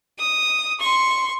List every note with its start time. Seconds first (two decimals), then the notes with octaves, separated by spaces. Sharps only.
0.18 D#6
0.79 C6 C#6